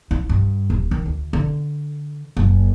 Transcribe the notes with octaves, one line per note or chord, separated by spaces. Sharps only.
E4
G2
D#1
D#3
D2
D3
F#1